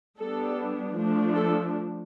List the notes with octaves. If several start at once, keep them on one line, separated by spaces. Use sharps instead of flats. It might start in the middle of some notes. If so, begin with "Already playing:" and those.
G3 B3 D4 A4
F3 A3 D4
A4